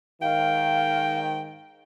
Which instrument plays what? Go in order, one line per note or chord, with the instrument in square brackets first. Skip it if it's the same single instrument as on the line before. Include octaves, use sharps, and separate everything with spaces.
[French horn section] G#2 D#3 [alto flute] F5 [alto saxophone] G5